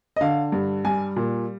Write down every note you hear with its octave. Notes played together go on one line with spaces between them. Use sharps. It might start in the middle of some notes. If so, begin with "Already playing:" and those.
D#5
D3 F5
G2
G3 G#5
A#2